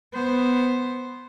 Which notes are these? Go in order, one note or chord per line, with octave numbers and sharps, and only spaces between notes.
B3 C5